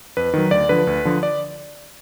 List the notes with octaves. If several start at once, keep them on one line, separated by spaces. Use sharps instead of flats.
F2 B4
D#3 F#3
D2 D5
D3 F3 B4
D2
D3 F3
D5